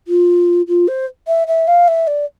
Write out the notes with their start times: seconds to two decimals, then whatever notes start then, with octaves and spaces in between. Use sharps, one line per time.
0.08 F4
0.68 F4
0.88 C5
1.28 E5
1.48 E5
1.68 F5
1.88 E5
2.07 D5